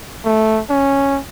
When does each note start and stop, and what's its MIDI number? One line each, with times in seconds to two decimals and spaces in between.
0.25 0.61 57
0.70 1.19 61